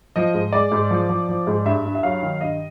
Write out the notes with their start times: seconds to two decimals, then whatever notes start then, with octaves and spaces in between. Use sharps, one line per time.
0.16 F3 D#5
0.34 G#2
0.53 G#3 D5
0.72 G#2
0.91 F3
1.09 F3
1.29 F3
1.47 G#2
1.65 G2 E5
1.85 G2
1.95 E5
2.03 F#3 F5
2.22 D#3
2.41 G2 D#5